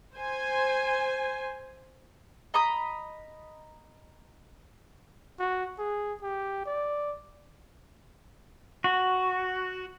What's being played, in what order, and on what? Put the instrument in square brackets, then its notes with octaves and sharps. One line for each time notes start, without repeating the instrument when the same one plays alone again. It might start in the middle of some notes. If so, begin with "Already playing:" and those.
[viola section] C5 G#5
[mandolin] D#5 A#5 B5 D#6
[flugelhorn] F#4
G#4
G4
D5
[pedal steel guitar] F#4